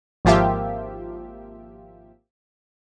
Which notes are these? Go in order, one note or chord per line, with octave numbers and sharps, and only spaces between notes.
G#1 F3 A#3 F4 G4 E5